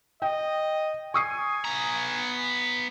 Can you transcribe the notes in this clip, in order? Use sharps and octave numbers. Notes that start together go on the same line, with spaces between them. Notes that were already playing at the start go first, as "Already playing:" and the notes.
D#5 G5
G#5 C#6 D#6 C7
B3 A#5